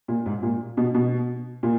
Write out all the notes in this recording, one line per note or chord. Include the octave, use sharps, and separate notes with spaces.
A#2
G#2
A#2
B2
B2
A#2